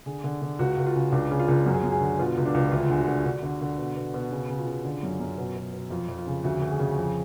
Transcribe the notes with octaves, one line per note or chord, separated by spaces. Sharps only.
D3 G#4
D3
D3
C#2 F#4
C#2
F4
C#3
C#2 D4
C#3
F4
C#2
F#2 F#4
G#4
F#2 F#4
G#4
D3
B2 F4
C#2
D4
C#2
D2 F4
D3 G#4
F#4
D3
D3
D3
D3
B2
B2
B2
C#3
C#3
F4
C#3
D3
F#2
F#2
B2
B2
B2
F2 F4
F2
F4
C#3
D2 F#4
D2
G#4
C#3
F2